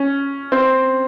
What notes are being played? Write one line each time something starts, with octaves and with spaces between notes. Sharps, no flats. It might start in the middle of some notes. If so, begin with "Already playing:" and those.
Already playing: C#4
C4